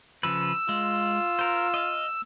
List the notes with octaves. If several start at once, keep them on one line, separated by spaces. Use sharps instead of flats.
C#3 F3 B4 E6
G#3 F4
A#4 C5
D#5 F5